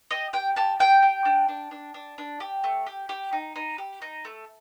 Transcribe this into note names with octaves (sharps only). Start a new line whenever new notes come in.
G4 D#5
G4 G5
G4 A5
G4 G5
G4
D4
D4
D4
D4
D4
G4
A3
G4
G4
D#4
D#4
G4
D#4
A3